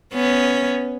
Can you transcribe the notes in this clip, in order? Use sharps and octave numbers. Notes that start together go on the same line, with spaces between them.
B3 C#4